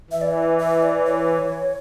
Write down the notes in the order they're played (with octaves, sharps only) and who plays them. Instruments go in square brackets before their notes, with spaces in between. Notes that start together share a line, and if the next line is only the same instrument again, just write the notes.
[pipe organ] E3 [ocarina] E5
[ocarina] D5
E5
E5
D5
C#5